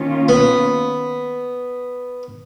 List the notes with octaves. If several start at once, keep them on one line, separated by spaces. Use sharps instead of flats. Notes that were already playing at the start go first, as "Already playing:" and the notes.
Already playing: D#3 A#3 C#4 F4
B3